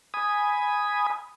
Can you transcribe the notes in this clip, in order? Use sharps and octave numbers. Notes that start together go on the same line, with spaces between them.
G#5 B5 D#6